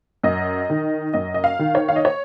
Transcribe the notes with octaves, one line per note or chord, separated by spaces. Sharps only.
F#2 D#5
D#3
F#2 D#5
D#5
F5
D#3
C#5
F5
D#5
C#5